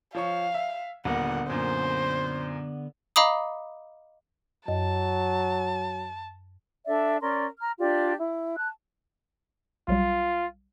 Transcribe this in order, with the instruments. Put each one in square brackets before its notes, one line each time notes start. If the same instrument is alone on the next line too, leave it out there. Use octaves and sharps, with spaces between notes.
[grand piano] F3 C#5 C#6 [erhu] F5
[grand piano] E5
[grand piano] D#1 A#3 [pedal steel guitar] D3 B3 [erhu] F#5
[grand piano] F#2 A#2 [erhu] C5
[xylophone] D#5 F5 A#5 B5 D6 D#6
[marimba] F#2 D#5 [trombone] F#3 [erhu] A5
[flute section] D4 A4 D5 E5
C#4 A#4 D5 C6
A#5 F6
D4 F4 G4 D5
E4
A5 F#6
[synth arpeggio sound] B1 F#3 G3 [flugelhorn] F4